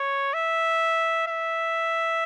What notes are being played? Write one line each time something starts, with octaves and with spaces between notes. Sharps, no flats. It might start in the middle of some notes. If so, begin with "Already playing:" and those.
Already playing: C#5
E5
E5